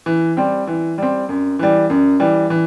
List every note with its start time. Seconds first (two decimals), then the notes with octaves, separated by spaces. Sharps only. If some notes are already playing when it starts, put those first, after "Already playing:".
0.06 E3
0.37 G3 C4
0.67 E3
0.98 G3 C4
1.29 F#2
1.59 E3 G3
1.90 F#2
2.20 E3 G3
2.50 E3